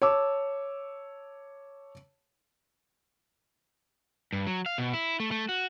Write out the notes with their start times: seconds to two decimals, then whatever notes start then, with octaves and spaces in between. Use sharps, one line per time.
0.02 C#5 A5 D6 E6
4.33 G2
4.47 F#3
4.66 F5
4.78 B2
4.93 E4
5.20 A3
5.31 A3
5.49 F#4